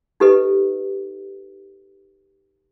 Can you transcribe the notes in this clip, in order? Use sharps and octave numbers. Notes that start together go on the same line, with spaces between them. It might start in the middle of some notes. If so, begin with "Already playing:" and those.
D#4 G4 A4 B4 D#5